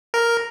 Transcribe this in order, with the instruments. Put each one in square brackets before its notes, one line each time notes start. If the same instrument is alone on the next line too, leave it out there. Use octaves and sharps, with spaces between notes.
[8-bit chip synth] A#4